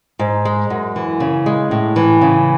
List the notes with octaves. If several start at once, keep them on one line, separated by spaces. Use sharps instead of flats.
G#2
G#3
F#2
E3
C#3
G#3
A2
E3
C#3